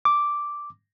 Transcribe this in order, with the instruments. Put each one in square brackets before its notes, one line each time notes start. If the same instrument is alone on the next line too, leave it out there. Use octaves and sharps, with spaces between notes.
[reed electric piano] D6